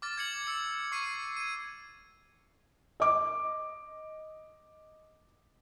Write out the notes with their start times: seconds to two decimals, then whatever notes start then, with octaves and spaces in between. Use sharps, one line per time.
0.02 D6 F6 A6
0.18 G#6 C#7 F#7
0.47 E6 C#7
0.92 C#6 C7 D#7
1.37 G#6 D#7
3.00 D#5 D6